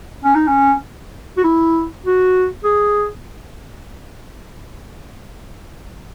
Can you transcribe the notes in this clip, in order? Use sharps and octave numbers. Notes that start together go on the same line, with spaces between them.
C#4
D#4
C#4
F#4
E4
F#4
G#4